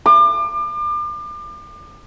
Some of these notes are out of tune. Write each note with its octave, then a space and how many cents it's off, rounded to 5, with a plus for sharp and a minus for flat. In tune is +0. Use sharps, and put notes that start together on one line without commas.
D6 +35